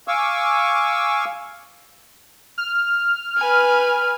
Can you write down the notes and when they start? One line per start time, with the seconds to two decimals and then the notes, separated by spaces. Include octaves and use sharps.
0.08 F5 G#5 C#6 D6 E6
2.58 F6
3.37 B4 G#5